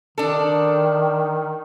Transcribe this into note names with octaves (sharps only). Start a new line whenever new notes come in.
D#3 D4 A4